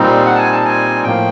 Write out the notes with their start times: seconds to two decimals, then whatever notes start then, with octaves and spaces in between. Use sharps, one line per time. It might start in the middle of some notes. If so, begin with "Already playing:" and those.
Already playing: A#2 G3 C4 D#4
0.26 F#5
0.35 A5
0.38 G#5
0.52 A5
0.65 G#5
1.04 A2 F3 A#3 G5